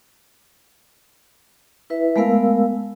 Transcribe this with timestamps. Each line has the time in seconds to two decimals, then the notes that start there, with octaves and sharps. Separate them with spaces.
1.90 E4 B4 E5
2.16 G#3 A3 B3 A#4 F5 E6